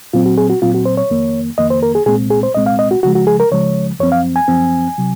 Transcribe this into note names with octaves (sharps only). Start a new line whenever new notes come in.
A#2 F#3 C4 F4
F#4
G#4
F#4
A#2 F#3 C4 F4
F#4
C5
C#5
F2 D#3 A#3
F2 D#3 A#3 D#5
C5
A#4
G#4
C2 A#2 G#3 C4 G#4
G#4
C5
C2 A#2 G#3 C4 D#5
F5
D#5
F#4
C#2 C#3 F3 G#3 F#4
F#4
G#4
A#4
C#2 C#3 F3 G#3 C#5
F#2 F3 C4 C#5
F5
G#5
F#2 F3 C4
C3 F#3